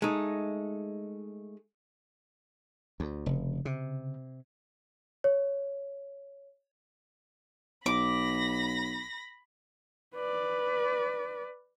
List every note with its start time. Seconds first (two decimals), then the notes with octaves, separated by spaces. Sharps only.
0.02 G#3 A3 D#4
3.00 D2
3.26 F1 C#3
3.65 C3
5.24 C#5
7.86 B1 B5 D6 A#6
10.15 B4 D5